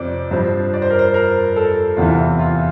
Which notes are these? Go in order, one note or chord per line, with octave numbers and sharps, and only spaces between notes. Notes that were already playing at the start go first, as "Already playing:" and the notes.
Already playing: F2 C3 C5 D5
G2 F3 C5
D5
C5
A#4
C5
A#4
A4
E2 C3 E3 F4
F4